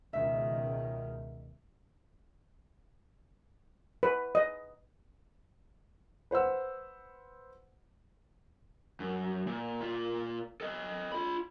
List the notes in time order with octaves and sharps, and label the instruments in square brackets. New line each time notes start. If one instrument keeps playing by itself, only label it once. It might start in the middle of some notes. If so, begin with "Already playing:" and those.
[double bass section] C#2 B2 D#3 [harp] E5
[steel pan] B4
D#5
[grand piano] B4 C5 F#5 E6
[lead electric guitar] F#2
A#2
A#2 F4
A4 D#5
F4 B5